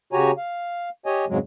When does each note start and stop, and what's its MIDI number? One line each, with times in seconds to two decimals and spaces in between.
0.13 0.31 49
0.13 0.31 66
0.13 0.31 67
0.13 0.31 73
0.13 0.31 80
0.13 0.31 82
0.37 0.89 77
1.06 1.25 67
1.06 1.25 73
1.06 1.25 75
1.06 1.25 80
1.29 1.38 41
1.29 1.38 44
1.29 1.38 49
1.29 1.38 54
1.29 1.38 56